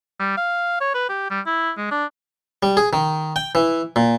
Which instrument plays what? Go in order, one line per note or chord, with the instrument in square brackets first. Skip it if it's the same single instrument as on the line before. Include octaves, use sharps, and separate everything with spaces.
[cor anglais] G3
F5
C#5
B4
G4
G3
E4
G#3
D4
[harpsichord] G3
G#4
D#3
G5
E3
A#2